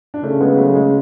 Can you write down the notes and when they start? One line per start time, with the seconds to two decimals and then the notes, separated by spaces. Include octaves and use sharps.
0.14 D4
0.23 C#3 A3 C#4
0.40 G#3 B3
0.57 F#3 A3
0.75 G#3